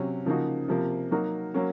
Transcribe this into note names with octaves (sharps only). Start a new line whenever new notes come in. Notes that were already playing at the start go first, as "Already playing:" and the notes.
Already playing: C3 F#3 C#4
C#3 F3 A#3 D#4 F#4
C3 F3 A#3
F#3 A#3 D#4 F#4 A#4
F#3 A#3 C#4